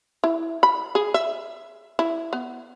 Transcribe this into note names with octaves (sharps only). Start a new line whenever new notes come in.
E4
B5
G#4
E5
E4
B3